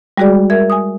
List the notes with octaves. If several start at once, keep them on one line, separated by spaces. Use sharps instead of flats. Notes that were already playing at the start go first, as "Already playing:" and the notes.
G3 G#3 F#4 G#4 D5
A#4 E5 G#6
G#5 D#6